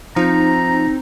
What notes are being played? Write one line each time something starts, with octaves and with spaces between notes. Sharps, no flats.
F3 C4 D#4 A#5